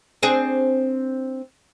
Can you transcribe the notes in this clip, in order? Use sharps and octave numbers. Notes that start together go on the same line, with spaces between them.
C4 D4 G#4